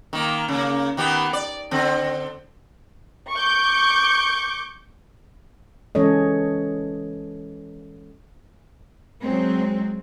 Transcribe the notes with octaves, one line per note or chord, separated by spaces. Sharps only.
D#3 A#3
C#3 A#3
D#3 B3 G4
D5
D3 C4
C#6 D6 G6
E3 G#3 C#4 A4 C#5 D#5
F#3 G#3 C4